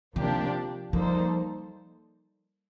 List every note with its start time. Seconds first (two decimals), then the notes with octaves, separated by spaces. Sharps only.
0.16 C3 D#3 F3 A#3 D4 G4
0.93 F3 G3 A#3 D#4 A4 C5